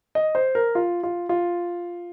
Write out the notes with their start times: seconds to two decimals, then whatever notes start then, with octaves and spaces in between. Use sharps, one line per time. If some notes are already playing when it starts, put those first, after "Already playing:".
0.15 D#5
0.35 C5
0.55 A#4
0.75 F4
1.03 F4
1.29 F4